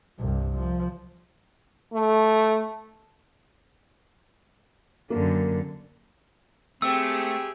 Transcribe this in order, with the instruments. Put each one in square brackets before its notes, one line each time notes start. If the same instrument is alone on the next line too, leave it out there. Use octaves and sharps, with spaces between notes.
[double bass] C2 G2
F3
[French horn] A3
[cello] F#2 D3 [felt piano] A#3
[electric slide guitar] A3 [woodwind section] C4 [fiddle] G4 G#4 [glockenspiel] E6